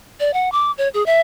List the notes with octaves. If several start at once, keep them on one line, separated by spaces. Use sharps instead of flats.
D5
F#5
D6
C#5
G#4
E5